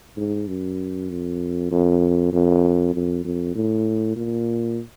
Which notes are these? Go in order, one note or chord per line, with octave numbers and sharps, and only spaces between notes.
G#2
F#2
F2
F2
F2
F2
F2
A2
A#2